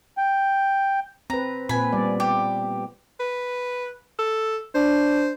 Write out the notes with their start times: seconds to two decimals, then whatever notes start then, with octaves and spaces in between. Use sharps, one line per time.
0.18 G5
1.30 C4 B4 A#5
1.69 A#2 C4 B4 G#5 B5
1.93 G3 B3 D5
2.20 G4
3.20 B4
4.19 A4
4.75 D4 C5